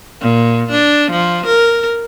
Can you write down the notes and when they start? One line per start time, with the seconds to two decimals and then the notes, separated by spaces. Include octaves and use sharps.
0.21 A#2
0.71 D4
1.12 F3
1.46 A#4